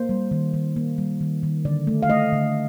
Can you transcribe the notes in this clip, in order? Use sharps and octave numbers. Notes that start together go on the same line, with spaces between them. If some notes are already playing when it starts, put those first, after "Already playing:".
Already playing: A#3 C5
G3
D#3
D#3
A#3
G3
D#3
D#3
D3 D5
A3
F5
A3 D#5
D3